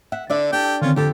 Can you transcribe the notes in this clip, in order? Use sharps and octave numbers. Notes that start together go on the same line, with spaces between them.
E5 F#5
D3 D4 D5 E5
D4 G4 A4 G5
D3 D#3 C4 C#4 F4
F2 D3 G4 A4 A5